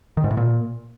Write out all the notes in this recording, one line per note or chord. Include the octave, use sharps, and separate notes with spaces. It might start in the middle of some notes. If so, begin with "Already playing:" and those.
D#3
G#2
A2
A#2